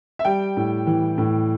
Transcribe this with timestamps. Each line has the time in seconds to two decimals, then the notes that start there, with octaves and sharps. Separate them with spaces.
0.19 E5
0.25 G3 G5
0.57 A2
0.87 E3
1.18 A2